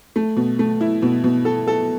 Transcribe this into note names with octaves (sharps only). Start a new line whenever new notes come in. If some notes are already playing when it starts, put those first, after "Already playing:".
A3
B2
A3
E4
B2
B2
A4
A4